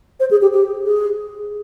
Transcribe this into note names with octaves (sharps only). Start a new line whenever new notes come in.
C5
G#4
G4
G4
G#4